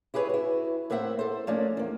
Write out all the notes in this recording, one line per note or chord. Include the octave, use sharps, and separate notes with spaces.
E4 G4 G#4 B4 C#5
E4 F#4
A2 A#3 C4 E5 F#5
A4 C5
F3 A3 A#3 C#4 D4
E2 A#3